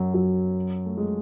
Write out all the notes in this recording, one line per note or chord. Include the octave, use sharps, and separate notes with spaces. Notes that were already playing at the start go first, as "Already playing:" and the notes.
Already playing: F#2 F#3
F#2 F#3
A3
G#3